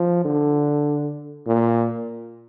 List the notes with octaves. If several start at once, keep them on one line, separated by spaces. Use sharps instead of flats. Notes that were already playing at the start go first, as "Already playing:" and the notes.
Already playing: F3
D3
A#2